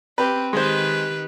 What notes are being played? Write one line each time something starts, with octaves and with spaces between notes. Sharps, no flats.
C4 G4 B4
D#3 G#3 G4 B4 C5